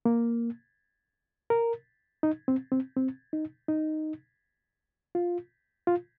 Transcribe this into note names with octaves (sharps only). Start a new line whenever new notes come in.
A#3
A#4
D#4
C4
C4
C4
D#4
D#4
F4
F4